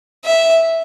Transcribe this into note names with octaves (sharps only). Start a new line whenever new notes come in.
E5